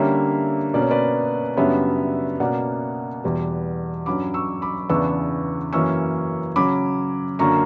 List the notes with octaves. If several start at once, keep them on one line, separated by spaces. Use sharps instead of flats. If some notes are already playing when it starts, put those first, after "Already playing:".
Already playing: D3 G3 A#3 C#4 C#5 E5
B2 A#3 C#4 D5
C#5
B4 D5
F#2 C#3 G3 B3 D4 C#5 E5
B2 A#3 C#4 D5 F#5
E2 B2 G3
G2 F#3 C#4 B5 D6
C#6 E6
B5 D6
E2 C#3 E3 B3 D4 C#6 E6
F#2 E3 A#3 C#4 C#6 E6
C#3 F#3 C#4 B5 D6
F#2 D3 A#3 C#4 A#5 C#6